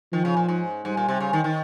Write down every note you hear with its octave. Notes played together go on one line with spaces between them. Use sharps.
D#3 F3
C#3
A#2
G#2
G#2 G3
A#2
C3
C#3
D#3
D#3